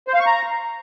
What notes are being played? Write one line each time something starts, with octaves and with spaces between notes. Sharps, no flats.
C5
F5
C#6
A#5